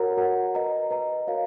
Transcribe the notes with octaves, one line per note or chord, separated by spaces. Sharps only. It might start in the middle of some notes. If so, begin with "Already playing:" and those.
Already playing: F#4 A#4 C#5 F#5 A#5
F#4 A#4 C#5 F#5 A#5
B4 D#5 A#5
B4 D#5 A#5
F#4 A#4 C#5 F5